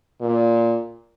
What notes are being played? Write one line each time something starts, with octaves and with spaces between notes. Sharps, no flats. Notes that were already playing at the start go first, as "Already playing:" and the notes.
A#2